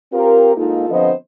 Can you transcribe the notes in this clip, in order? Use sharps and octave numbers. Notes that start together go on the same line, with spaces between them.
C4 F4 G4 A#4
G#2 A#3 D#4 F4 A4
D3 F3 B3 C4 C5 D#5